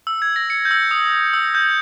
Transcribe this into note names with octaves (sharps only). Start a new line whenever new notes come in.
E6
G#6
A#6
C#7
G6
E6
D#6
E6
G6